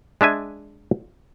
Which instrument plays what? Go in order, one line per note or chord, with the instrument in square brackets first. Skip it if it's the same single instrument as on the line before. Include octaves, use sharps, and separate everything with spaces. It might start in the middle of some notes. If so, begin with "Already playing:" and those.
[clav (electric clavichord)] G#3 D4 E5 G#5